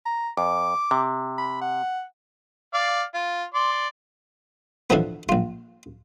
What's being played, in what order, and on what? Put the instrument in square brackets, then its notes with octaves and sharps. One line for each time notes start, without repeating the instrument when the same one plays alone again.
[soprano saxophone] A#5
[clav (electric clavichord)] F2 [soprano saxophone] D6
[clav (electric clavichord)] C3
[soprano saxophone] B5
F#5
[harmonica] D5 F5
F4
D5 C6
[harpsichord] B2 D3 E3 F3 B3
A#1 F4